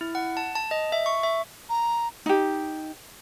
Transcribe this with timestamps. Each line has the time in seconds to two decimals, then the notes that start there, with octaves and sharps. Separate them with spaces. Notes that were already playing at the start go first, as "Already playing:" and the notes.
0.01 E4
0.15 F#5
0.37 A5
0.55 A5
0.71 D#5
0.92 E5
1.06 C#6
1.23 E5
1.69 A#5
2.26 D#4 G4